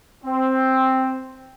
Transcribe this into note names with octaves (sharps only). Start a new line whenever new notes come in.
C4